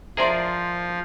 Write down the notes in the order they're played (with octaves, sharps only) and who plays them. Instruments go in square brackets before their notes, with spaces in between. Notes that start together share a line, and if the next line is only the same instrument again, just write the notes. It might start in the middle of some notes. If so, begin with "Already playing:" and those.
[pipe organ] F3 [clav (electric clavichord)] G#4 A#4 D5 [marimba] C5 E5 [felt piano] A#5 C6